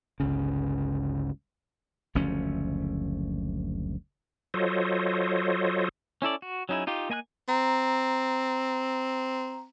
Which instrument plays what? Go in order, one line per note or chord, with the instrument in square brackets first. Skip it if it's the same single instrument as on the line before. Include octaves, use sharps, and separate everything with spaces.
[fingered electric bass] G1 C#2 C#3
[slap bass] F#1 D2 F3 C#4
[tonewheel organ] F#3 F4 A4 C5 C#5 D#5
[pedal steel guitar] C#4 E4 A4 D5
F#4
F#3 C#4 D#4 E4 G#4
D#4 F4 G4
A#3 D#5 G#5 B5 F#6
[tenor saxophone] C4 [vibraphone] A#5